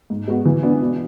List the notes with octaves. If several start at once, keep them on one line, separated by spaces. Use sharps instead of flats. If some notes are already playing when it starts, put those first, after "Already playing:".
G#2
G#3 B3 F#4
E3
B3 D4
B2